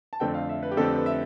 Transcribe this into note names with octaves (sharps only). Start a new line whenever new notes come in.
A5
F2 D3 A3 C4 G5
F5
E5
B4
G4
F2 D3 A3 C4 A4
B4
E5